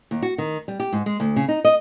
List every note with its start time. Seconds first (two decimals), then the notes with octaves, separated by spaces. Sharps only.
0.11 D#2
0.22 F#4
0.38 D#3
0.68 G3
0.80 G4
0.93 G#2
1.06 G#3
1.20 D2
1.36 C#3
1.48 D#4
1.64 D#5